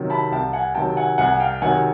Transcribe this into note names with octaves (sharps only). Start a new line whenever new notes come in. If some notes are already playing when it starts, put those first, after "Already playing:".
Already playing: C3 D#3 F#3
A5 B5
C2 G5 A5
F#5 G#5
C3 D#3 F#3 G5 A5
F#5 G#5
C2 F#5 G#5
F5 G5
C3 D#3 F#3 F#5 G#5